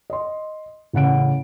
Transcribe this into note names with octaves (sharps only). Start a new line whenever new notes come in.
D#5 C6
A1 C#3 F#5 D7